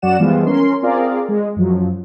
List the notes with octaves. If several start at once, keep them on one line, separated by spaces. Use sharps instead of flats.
F#2 F#3 F#4 D5 F#5 E7
E3 F3 G3 G#3 B3 F4
C#4 A#4 C6
C4 F4 G#4 A#4 D5 F5
G#3
F#2 F3 F#3